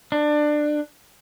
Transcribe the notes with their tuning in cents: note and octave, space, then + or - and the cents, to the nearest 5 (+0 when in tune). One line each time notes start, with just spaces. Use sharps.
D4 +20